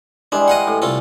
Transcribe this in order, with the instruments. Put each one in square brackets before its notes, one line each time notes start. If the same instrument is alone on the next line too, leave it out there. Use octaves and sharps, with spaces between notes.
[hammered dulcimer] E3 G3 G#3 [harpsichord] D4
[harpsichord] D#5 F5 F#5
[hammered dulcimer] A2
[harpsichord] C2 F4 A4